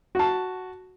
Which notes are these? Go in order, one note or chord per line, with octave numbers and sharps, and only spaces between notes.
F#4 A5